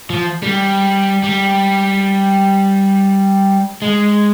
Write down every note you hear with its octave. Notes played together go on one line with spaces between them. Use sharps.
F3
G3
G3
G#3